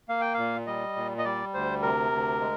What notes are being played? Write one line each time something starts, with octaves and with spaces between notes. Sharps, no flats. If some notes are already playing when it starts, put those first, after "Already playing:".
A#3 F5
G5
A#2 F5
G3 D#5
A#2
D#5
G3 D5
D2 C5
C3 A#4
D2
G#3